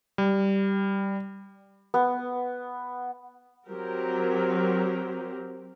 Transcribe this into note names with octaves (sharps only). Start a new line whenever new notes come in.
G3
B3
F#3 C4 G4 A#4